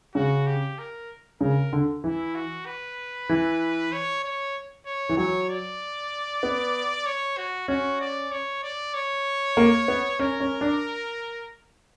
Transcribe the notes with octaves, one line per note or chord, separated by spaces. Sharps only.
C#3 F#4
G4
A#4
C#3 A#4
D3
E3 E4
F#4
B4
E3
C#5
C#5
C#5
E3
F#3 C#5
D5
B3
C#5
F#4
C#4 F#4
D5
C#5
D5
C#5
A#3
B3
C#4 A#4
C#4
D4